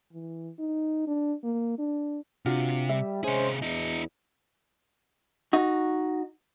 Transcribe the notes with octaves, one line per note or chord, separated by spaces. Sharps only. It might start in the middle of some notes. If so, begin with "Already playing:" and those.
E3
D#4
D4
A#3
D4
C3 D4 F4 F#4
G3 E5
C3 G#3 C#4 G#4 C5
E2 E4 D#5
D#4 F#4